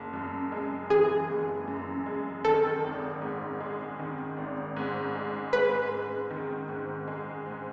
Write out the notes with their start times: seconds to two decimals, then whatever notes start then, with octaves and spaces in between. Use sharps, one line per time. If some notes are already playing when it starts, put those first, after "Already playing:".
Already playing: F#1
0.13 F#2
0.52 G#3
0.90 E3 G#4
1.29 F#1
1.68 F#2
2.06 G#3
2.45 D#3 A4
2.84 G#1
3.22 G#2
3.60 G#3
3.99 D#3
4.37 G#1
4.77 G#2
5.15 G#3
5.53 G#3 B4
5.91 G#2
6.30 D#3
6.69 G#2
7.08 G#3
7.46 G#2